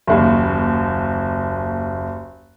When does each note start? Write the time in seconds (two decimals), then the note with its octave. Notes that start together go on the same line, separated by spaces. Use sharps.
0.07 F#1 D#2